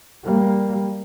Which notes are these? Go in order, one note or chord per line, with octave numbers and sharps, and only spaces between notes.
G3 A#3